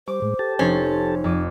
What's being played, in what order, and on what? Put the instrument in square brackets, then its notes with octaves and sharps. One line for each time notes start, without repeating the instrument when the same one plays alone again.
[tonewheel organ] G3 [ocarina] C5 [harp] D6
[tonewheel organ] A2 G#3
G4 A4 A5
[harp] F1 C5 [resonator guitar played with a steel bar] C#4 [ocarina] D#4
[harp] F2 D6 D#7